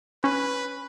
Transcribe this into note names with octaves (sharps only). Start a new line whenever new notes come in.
C#4 B4